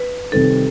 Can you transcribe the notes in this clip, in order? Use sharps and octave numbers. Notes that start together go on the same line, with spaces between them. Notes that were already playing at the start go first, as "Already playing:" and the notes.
Already playing: B4
C3 D#3 G3 C4 D#4 A4